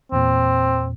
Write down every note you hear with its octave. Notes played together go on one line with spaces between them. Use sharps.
E2 A#2 C4